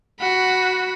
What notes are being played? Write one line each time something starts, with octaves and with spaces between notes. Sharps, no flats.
F#4 B5